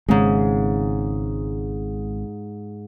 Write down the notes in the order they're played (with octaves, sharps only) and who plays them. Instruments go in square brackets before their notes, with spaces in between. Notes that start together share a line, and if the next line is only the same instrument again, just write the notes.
[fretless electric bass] G#1 C#3 [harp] G#2 G#3